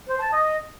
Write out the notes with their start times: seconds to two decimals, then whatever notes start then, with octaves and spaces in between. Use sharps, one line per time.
0.09 C5
0.21 A5
0.33 D#5